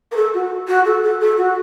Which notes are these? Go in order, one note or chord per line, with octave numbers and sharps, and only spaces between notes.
A#4
A4
F#4
F#4
A4
A4
A4
F#4